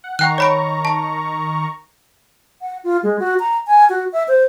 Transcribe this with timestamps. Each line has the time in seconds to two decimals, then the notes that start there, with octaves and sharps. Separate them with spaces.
0.04 F#5
0.19 D#3 F#5 G5 A#5 C#6 F#6
0.38 C#5 B5 D7
0.85 A5
2.61 F#5
2.84 F4
3.03 G#3
3.20 F#4
3.40 A#5
3.67 G#5
3.90 F#4
4.13 E5
4.28 C5